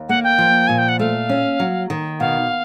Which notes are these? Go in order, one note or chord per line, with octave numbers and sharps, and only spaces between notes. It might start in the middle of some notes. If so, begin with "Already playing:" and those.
Already playing: D#2
A#3 F#5
G5
F3
A#2 G#5
G5
F#5
A3 F5
C#4
F#3
D#3
B2 F5